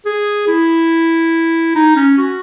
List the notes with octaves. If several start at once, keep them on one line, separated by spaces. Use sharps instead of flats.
G#4
E4
D#4
C#4
F#4